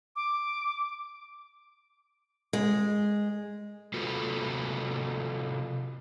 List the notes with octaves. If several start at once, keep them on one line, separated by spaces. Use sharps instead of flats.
D6
G#3
C3 A#3 F4 F#4 A4 B4